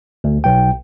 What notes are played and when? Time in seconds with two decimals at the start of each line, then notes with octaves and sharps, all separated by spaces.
0.24 D2
0.44 B1 G5